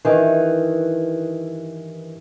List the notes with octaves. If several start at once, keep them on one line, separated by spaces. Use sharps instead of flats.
G2 D#3 E3